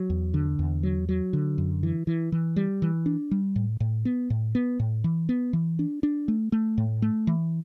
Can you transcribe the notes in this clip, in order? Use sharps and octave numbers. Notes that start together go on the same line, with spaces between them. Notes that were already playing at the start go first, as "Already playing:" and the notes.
Already playing: F#3
E2
D3
E2
F#3
F#3
D3
F#2
E3
E3
E3
G3
E3
D4
G3
A2
A2
B3
A2
B3
A2
E3
B3
E3
D4
D4
A3
A3
A2
A3
E3